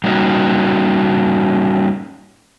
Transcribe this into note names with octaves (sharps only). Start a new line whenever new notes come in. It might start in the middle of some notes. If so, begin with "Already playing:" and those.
G3 A#3 C#4 D#4 F#4